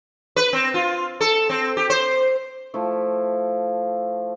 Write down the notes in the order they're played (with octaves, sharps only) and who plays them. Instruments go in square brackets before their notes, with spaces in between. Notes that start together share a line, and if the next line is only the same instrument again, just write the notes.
[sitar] B4
C4
F4
A4
C4
G4
C5
[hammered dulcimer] F3 A3 E4